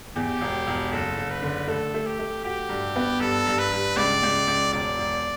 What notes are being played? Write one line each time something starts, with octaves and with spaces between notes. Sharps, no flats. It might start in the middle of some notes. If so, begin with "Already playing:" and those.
E2 G4
E1
E1
F#1 A4
F#1
B4
D3
A3 A4
A3
G4
A3
F#4 G4
G2
B3
G2 A4
G2
B4
G2
C#2 D5
C#2
C#2
E1 D5
E1